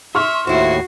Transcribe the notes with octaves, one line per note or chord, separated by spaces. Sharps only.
E5 C6 C#6 F6
D#2 A2 E4 F#4 C5 C7